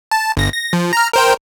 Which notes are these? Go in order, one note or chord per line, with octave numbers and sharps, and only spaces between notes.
A5
G1 A#6
A#6
F3
A#5 F6
A#4 C5 G5